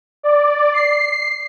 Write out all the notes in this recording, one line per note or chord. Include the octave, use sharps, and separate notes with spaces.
D5
C7